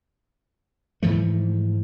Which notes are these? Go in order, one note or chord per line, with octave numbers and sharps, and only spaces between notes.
G#2 E3 F3 A3